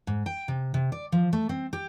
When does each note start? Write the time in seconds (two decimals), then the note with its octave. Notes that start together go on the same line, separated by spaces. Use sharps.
0.07 G#2
0.26 G5
0.48 C3
0.74 C3
0.92 D5
1.12 F3
1.33 A3
1.49 C4
1.73 G4